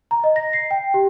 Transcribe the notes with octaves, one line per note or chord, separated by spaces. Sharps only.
A#5
D#5
A#6
C7
G5
G4